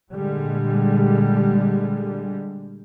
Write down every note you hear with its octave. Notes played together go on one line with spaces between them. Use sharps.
A#2 D3 G3 G#3